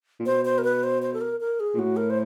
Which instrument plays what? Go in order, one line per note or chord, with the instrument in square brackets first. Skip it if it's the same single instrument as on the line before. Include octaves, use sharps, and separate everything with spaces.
[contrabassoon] A#2
[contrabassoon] B2 [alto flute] C5
[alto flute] C5
A#4
B4
C5
C5
A4
A#4
A#4
G#4
[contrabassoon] A#2
[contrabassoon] A2 [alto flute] F#4
[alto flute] A#4
C5